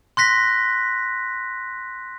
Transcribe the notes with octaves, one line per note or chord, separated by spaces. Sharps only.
C6 F#6 A#6 B6